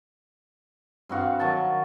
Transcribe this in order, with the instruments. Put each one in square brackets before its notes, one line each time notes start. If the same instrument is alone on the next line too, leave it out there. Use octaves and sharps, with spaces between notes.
[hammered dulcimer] G2 C4 F#4 F5
D#3 F#3 A5 C#6